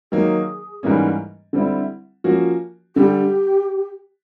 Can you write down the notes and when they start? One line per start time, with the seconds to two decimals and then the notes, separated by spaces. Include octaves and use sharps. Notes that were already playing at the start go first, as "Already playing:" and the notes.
0.12 D#3 F#3 A#3 G#4
0.83 G#2 E3 G3 A#3 C#4
1.53 D3 G3 C4 E4
2.24 F3 A#3 C#4 F#4
2.95 D3 G3 G4